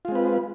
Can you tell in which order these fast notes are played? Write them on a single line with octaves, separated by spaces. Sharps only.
F4 G#3 C4 B4